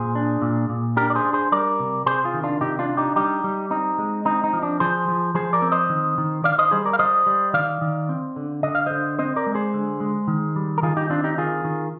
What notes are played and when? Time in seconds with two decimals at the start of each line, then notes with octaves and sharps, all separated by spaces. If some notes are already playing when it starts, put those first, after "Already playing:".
Already playing: A#2 G#4 C5
0.15 D4
0.42 A#2
0.69 A#2
0.97 D4 G4 A#4
1.10 D5
1.15 G#4 C5
1.25 D4
1.33 G#4 C5
1.52 G3 A#4 D5
1.80 C3
2.06 C3 G#4 C5
2.24 F4 G#4
2.34 D#3
2.43 D4 F4
2.61 C3 D#4 G4
2.79 D4 F4
2.89 D4
2.97 D#4 G4
3.16 G3 D#4 G4
3.44 G3
3.70 C4 D#4
3.98 G#3
4.25 C4 D#4
4.44 D#4
4.53 F3
4.62 D4
4.80 F3 G#4 C5
5.08 F3
5.34 F3 G#4 C5
5.53 A#4 D5
5.62 C4
5.72 C5 D#5
5.89 D#3
6.18 D#3
6.44 D#3 D5 F5
6.58 C5 D#5
6.71 G3 G#4 C5
6.85 A#4 D5
6.93 F5
6.99 G3 C5 D#5
7.26 G3
7.53 D#3 D5 F5
7.81 D#3
8.09 C4
8.36 D3
8.63 D3 D#5
8.75 F5
8.86 D3 C5 D#5
9.19 C4 C5 D#5
9.36 A#4 D5
9.47 G#3
9.55 G#4 C5
9.74 D3
10.00 G#3
10.27 D#3
10.56 G3
10.78 A#4
10.83 D#3 F4 G#4
10.97 D#4 G4
11.10 C4 D4 F4
11.24 D#4 G4
11.38 D#3 F4 G#4
11.64 D#3